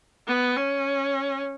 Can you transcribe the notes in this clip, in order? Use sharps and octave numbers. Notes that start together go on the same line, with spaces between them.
B3
C#4